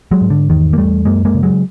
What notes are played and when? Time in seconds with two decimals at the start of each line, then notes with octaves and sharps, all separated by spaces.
0.11 F#3 G#3
0.21 G#2
0.30 D3
0.50 E2 D#3
0.73 A#3
0.77 E2 G3 A3
1.05 F#2 G#3 A#3
1.25 G#3 A#3
1.35 C#3
1.43 F#3 G#3